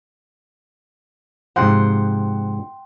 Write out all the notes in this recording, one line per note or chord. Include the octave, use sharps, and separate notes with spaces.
G#2 C3 F3 F#5 G5 C6